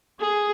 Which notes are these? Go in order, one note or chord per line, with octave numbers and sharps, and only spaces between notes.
G#4